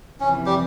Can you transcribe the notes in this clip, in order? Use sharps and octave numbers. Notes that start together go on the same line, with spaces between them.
F2 C3 E3 C#4
G3 G4